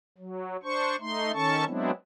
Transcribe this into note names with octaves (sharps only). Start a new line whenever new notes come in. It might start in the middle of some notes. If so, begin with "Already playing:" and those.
F#3
D4 C5 C#6
A3 D#4 C6
D#3 C#4 A4 A5 C#6
F#3 G#3 B3 C4 D4 E4